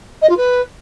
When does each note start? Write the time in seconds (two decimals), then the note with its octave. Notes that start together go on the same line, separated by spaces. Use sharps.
0.22 D#5
0.29 F4
0.37 B4